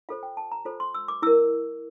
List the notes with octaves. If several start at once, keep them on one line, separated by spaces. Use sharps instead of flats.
F4 A4 C5 F5
G5
A5
A#5
F4 A4 C5
C6
E6
D6
E4 A#4 E6